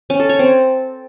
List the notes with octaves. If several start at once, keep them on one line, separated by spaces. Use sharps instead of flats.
C#4
A4
C#5
C4